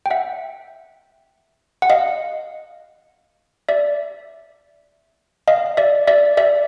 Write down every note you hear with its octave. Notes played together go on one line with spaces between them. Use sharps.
G5
E5 F#5
F#5
D#5 F5
D5 E5
D#5 F5
D5 E5
D5 E5
D5 E5